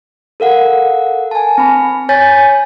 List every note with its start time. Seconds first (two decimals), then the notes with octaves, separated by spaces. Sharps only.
0.40 A4 A#4 F5 F#5
1.31 G#5 A5
1.58 C4 B5
2.09 C#5 G#5 G6 A6 B6